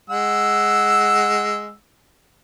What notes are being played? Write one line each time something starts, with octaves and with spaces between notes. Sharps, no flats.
G#3 F#5 E6